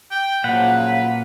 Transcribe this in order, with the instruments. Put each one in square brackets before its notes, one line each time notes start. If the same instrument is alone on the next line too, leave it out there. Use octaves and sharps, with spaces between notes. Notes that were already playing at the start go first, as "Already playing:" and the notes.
[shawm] G5
[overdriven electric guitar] A#2 [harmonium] C#3 F3 F#3 [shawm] B4 [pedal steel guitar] F#5